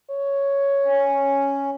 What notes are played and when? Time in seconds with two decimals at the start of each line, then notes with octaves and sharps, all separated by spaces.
0.10 C#5
0.85 C#4